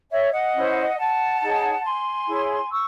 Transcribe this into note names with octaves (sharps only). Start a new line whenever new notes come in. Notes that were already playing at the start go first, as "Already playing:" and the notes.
C#5 E5
D#5 F#5
C#4 E4 C5
F#5 A5
D#4 G#4 C#5
G#5 C6
E4 G#4 C#5
C#6 E6